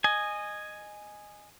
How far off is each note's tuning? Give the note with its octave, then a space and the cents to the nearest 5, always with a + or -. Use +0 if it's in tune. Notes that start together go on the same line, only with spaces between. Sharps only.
D#5 -15 G#5 +0